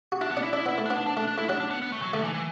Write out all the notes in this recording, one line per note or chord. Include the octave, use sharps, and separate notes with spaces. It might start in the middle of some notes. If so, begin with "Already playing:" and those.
F#4
D4 E4
B3
D4
E4
D4 E4
B3 E4
A3
D4
B3
D4
D4
A3 D4
D4
A3 E4
F#3 D4
D4
B3
B3
A3
F#3
D3 A3
E3
E3